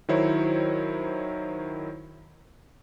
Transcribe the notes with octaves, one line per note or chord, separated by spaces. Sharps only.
D#3 F#3 E4 C5 C#5